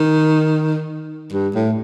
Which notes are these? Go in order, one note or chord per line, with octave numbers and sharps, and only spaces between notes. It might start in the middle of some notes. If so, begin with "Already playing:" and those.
Already playing: D#3
G2
A2